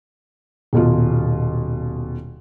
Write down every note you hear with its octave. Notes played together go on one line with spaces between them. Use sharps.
D#1 B2 F4